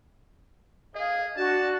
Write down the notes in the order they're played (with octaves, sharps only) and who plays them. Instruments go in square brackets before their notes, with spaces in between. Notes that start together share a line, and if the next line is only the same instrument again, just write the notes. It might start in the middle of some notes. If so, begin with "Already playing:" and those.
[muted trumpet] G#4 [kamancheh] D#5 F5
[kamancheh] D4 [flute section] F#4 [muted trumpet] A5